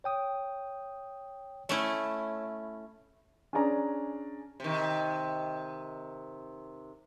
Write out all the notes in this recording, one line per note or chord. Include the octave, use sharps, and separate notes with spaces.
C#5 G5 D#6
A3 C#4 E4 C#5
C#4 D4 G#4 D5 A#5
C3 D#3